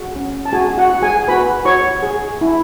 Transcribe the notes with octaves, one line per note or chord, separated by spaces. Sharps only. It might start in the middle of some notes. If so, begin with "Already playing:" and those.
Already playing: F#4 G#4 F#5
C#4
A5
F#4 G#4 G#5
F#4 F#5
F#4
G#4 G#5
F#4 B4 B5
F#4 C#5 C#6
G#4
E4